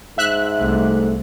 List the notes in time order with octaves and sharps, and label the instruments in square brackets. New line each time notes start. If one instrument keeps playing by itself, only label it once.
[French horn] G#2 [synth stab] E5 F#6
[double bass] C2 [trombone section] A3